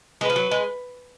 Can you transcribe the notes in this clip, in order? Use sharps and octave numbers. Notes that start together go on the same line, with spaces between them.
G#3 B4
F3
F#3
G#3